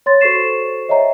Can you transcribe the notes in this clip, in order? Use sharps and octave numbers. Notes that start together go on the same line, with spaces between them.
C#5 C6 A6
F#4 A4 C5 C#6 C7 E7
C#5 D#5 E5 G5 A#5